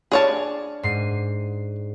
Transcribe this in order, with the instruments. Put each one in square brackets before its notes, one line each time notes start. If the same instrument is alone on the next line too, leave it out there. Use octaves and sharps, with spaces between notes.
[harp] D4 D5 F6 [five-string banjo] G#4 C#5 A5
[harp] G#2 C7 D#7